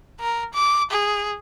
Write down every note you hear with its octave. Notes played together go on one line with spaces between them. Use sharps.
A#4
D6
G#4